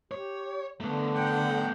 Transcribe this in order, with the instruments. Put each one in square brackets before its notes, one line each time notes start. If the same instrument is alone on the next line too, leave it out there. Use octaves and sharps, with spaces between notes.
[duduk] G4 [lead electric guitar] C#5
[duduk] D3 [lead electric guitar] A3 B3
[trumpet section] F#5 G5